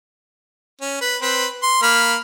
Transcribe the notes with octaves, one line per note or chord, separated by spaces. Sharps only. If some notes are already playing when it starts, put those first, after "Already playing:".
C#4
B4
C4 B4
C6
A#3 B5 F6